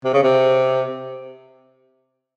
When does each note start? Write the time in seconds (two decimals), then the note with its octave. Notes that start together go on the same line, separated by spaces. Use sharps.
0.04 C3
0.13 C#3
0.23 C3